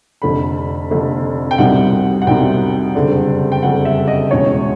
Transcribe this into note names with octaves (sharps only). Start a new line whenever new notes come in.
F1 F2 D3 B5
F1 F2 D3
G5
C2 B2 G3 C4 D#4 F#5
F#5
C2 B2 G3 C4 D#4 G5
F#1 F2 D3 G3
G5
F#1 F2 D3 G3 F#5
E5
D#5
E1 E2 B2 G#3 C#4 C#5